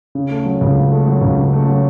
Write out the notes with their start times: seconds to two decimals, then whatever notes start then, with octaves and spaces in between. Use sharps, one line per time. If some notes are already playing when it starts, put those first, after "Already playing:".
0.15 C#3
0.31 A3
0.46 F#3
0.61 C#2
0.76 C#3
0.91 A3
1.07 F#3
1.21 C#2
1.38 C#3
1.53 A3
1.67 F#3